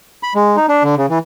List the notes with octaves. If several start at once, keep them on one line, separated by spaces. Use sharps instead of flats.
B5
G#3
D#4
D4
D3
C#3
E3